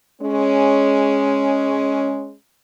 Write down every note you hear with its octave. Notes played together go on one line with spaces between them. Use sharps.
G#3 C#4